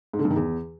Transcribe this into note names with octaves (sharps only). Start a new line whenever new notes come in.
G#2
D3
G2
D#3
E2